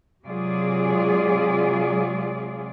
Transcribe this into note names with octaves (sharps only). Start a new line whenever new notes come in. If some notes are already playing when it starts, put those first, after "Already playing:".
C3 F#3 G#3 F4 G#4 D5